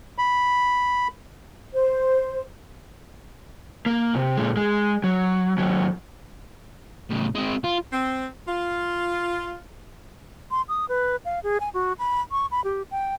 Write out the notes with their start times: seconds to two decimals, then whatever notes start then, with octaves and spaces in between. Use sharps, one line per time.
0.18 B5
1.73 C5
3.86 A#3
4.15 C3
4.37 A#2 G#3
4.57 G#3
5.04 F#3
5.58 D#2 F#3
7.11 A2 C#3
7.35 G#3 C4
7.64 F4
7.93 C4
8.47 F4
10.51 C6
10.69 D#6
10.89 B4
11.25 F5
11.44 G#4
11.60 G#5
11.74 F#4
11.99 B5
12.31 C#6
12.51 B5
12.64 G4
12.91 G5